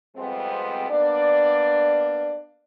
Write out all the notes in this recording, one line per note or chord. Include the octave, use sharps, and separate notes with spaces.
F2 G3 G#3 B3 C4
A#3 B3 D4 D5